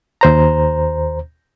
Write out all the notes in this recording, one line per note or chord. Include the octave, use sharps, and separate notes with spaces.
D#2 C5 A#5